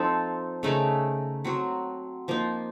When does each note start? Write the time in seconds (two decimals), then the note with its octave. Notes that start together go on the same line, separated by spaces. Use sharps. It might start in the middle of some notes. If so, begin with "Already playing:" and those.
Already playing: F3 C4 D#4 A4
0.63 C#3 A3 D#4 A#4
1.45 F#3 C4 F#4
2.28 F3 A#3 D#4